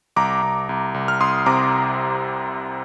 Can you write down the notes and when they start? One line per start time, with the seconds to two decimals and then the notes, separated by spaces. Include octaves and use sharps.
0.16 C2 A#5 D6
0.43 C2
0.69 C2
0.94 C2
1.08 F6
1.20 C2 C6 D#6
1.46 C3 A#5 D6